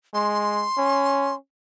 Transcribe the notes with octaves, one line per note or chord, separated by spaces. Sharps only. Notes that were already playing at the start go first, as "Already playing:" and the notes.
G#3 C6
C#4